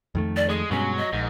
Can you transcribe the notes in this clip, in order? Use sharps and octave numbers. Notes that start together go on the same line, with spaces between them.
F2 D#3 A3
D5
G#3 G#4
G2 B2 F#3 G#3 C#4
D#5
A#1 G#2